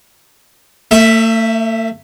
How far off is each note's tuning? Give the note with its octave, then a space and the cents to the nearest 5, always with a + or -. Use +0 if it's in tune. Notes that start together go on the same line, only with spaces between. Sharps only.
A3 +40 E5 +0